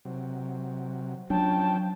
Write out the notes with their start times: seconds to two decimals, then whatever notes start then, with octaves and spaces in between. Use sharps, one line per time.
0.05 C3 F#3
1.30 F3 F#3 C#4 D4 G5 A5